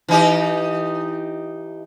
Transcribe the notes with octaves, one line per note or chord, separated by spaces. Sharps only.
E3 D#4 G4